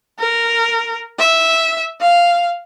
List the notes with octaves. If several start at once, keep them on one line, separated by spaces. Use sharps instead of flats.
A#4
E5
F5